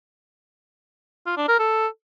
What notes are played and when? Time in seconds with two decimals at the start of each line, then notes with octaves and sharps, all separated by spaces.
1.26 F4
1.37 D4
1.48 A#4
1.59 A4